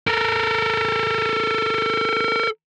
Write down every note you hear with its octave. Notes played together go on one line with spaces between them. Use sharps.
A4 A#4